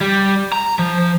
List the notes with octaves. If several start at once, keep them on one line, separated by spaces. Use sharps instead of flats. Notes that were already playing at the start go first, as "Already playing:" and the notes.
G3
A#5
F3